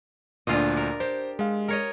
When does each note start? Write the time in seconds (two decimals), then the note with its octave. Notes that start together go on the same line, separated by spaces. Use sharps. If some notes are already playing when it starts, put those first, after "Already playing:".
0.47 D2 A#2 D4 F4 D#5
0.77 A#4
1.00 G4 C5
1.39 G#3 F5
1.68 A#4 C#5 D#5